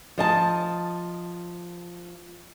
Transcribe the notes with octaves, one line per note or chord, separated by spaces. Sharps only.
F3 D#5 A5